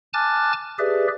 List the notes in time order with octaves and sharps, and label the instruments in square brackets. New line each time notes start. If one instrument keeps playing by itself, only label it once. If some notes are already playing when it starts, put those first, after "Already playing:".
[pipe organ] G#5 A5 D6 F6 F#6 A6
G4 G#4 B4 D5 E5